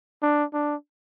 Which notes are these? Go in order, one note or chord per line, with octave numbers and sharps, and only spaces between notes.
D4
D4